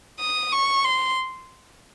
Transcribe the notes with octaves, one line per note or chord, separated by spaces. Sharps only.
D#6
C#6
C6